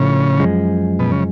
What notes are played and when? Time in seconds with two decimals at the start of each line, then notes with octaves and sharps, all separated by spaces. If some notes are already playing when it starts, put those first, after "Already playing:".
Already playing: A2 C#3 F3 A3 D4
0.39 F#2 F3 G#3
0.99 B2
1.12 C#3